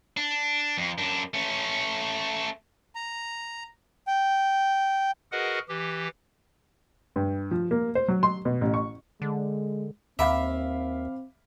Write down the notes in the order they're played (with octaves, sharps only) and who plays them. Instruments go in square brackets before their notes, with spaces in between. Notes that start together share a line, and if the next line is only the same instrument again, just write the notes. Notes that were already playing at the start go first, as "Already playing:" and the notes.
[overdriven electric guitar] D4
F2
F#2 D4
A3 C#4
[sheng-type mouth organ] A#5
G5
[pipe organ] F#4 G#4 A#4 B4 D#5 F#5
E3 G4
[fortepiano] G2
F3
A#3
C5
F#3
C6
B2
A1
C#6
[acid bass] D3 [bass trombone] G#3
[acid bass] D#2 [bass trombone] C4 [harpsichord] E5 [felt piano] F5 B5 D6